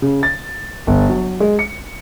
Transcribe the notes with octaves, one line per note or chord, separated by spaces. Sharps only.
C#3
A6
G1
F#3
G#3
C#7